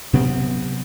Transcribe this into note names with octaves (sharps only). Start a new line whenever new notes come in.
C3 F#3 B3 C4